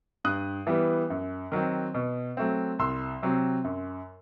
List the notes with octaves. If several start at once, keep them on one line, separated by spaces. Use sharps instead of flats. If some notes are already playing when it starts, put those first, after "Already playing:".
G2 D#6 F#6
E3 G3 B3
F#2
D#3 F#3 C4
B2
F#3 A3 C4
C2 C6 E6
C3 F#3 C4
F#2